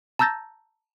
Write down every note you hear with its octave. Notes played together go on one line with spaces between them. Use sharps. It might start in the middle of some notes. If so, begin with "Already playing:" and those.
A5 A#5 E6 G6 A6 A#6